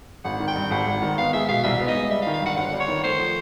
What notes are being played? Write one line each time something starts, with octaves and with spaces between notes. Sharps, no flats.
G#1 F#5
D#3
G5
G2
G#1 F#5
G#1
D#3
B3 F5
G#3 E5
B2 F5
C2 E5
B3
D#5
G#3
G3 E5
F5
D#3
F5
G2 F#5
G1 F#5
G3
C#5
D#3
A3 C5
F3